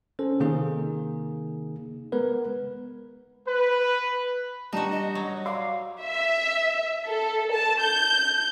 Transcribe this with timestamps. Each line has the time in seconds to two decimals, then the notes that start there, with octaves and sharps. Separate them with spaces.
0.19 C#4 A4 C5
0.40 C3 D#3 A#3 D#4 G#4
2.12 G#3 B3 A#4 B4
3.47 B4
4.73 G3 D4 D#4 F#4 A5
4.91 D#5
5.15 F#3
5.46 D5 F5 C6 D6
6.03 E5
7.08 A4
7.53 A5
7.81 G6